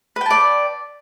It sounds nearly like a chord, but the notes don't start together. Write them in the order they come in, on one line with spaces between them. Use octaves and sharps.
B4 G5 A5 D5